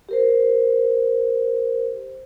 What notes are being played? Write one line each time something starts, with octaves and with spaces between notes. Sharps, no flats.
G4 A#4 C5